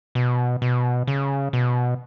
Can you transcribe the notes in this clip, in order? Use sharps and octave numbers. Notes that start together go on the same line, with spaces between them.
B2
B2
C#3
B2